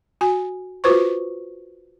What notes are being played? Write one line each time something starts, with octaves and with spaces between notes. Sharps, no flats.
F#4 G#5
F4 F#4 B4 C5 C#6